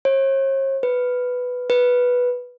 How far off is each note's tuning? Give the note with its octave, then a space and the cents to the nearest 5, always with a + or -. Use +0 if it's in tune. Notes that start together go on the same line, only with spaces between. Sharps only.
C#5 -45
B4 +5
B4 -5